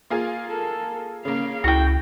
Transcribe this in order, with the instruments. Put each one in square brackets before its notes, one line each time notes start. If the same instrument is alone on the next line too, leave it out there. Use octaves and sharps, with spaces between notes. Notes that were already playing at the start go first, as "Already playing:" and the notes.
[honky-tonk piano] A#3 F4 G#4
[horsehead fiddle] A4 A#4
[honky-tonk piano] C#3 A#3 [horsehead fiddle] F5
[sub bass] C#2 [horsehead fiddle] E4 [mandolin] F#4 G5